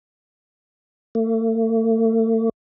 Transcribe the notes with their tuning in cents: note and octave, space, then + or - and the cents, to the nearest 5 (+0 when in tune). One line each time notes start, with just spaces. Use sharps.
A3 +40